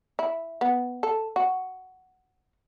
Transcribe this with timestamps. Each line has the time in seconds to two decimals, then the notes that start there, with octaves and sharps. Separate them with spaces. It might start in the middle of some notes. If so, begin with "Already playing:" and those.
0.19 E4
0.61 B3
1.03 A4
1.36 F#4